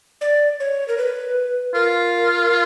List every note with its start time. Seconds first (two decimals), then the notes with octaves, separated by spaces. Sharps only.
0.21 D5
0.60 C#5
0.88 A#4
0.98 B4
1.75 F4 A#4